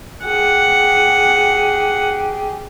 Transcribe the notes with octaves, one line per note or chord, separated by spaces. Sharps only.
G4 G#4 F#5